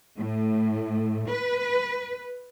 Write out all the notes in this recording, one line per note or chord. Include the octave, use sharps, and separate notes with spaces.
A2
B4